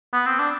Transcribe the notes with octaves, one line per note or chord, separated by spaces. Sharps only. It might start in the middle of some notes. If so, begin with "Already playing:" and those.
B3
C4
D4